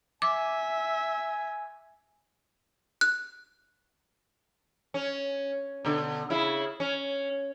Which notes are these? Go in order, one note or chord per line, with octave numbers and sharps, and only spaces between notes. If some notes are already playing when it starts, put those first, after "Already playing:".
E5 G#5 D6
F#6
C#4
B2 D3
C#3 E4
C#4